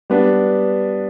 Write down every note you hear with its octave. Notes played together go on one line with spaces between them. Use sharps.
G3 B3 D4